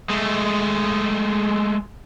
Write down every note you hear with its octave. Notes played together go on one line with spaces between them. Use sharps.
G#3 A3